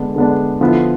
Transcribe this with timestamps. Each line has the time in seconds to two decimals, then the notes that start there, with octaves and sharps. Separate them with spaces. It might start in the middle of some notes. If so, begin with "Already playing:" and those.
Already playing: D3 G#3 B3 D4
0.16 D3 G#3 B3 D4
0.61 D3 F3 B3 E4